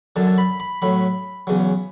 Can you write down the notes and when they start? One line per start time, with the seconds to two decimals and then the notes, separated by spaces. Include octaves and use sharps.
0.16 F#2 D3 F#3 A5
0.27 A5
0.38 B5
0.60 B5
0.82 A2 F#3 B5
1.47 E2 C#3 F#3